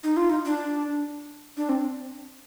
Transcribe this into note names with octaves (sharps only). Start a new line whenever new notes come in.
D#4
F4
D#4
D4
D4
C4